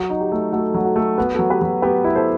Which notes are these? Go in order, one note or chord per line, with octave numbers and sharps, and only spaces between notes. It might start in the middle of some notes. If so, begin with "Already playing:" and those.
Already playing: F#3 F#4
D#4
G4
A3
A3 F#4 A4
F#3
F#4 A4
A3
B3 F#4
F#4 A4
F#3
G4 B4
F#3
B3 G4 B4
E4
A4 C5